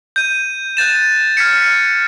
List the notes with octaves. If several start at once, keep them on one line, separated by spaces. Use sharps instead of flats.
G6 D#7
F#6 G6 A6 E7
F6 G#6 B6 C#7